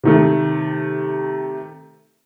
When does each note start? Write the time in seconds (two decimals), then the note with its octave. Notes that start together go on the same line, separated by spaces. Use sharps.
0.03 C3 D#3 A3